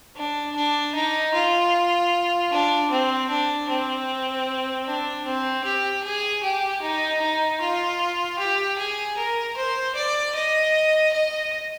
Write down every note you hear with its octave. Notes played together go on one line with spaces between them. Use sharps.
D4
D4
D#4
F4
D4
C4
D4
C4
D4
C4
G4
G#4
G4
D#4
D#4
F4
G4
G#4
A#4
C5
D5
D#5
D#5